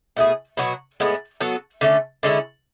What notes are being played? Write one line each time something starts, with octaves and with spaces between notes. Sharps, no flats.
B2 A3 E4 G#4
B2 F#3 B3 F#4
A2 G#3 B3 E4
F#3 B3 F#4 A4
D3 A3 C#4
D3 G#3 C#4 E4